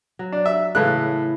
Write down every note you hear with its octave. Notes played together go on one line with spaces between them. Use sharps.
F#3
D4
E5
A2 C#3 E3 A3 F#6